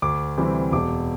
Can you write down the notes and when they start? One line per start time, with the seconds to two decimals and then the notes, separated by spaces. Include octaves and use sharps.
0.02 D2 D6
0.37 C3 E3 G3 C4
0.72 E1 D6